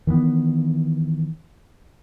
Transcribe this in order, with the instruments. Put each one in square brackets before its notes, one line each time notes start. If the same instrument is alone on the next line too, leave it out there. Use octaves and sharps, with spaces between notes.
[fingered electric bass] D#3 E3 A#3 B3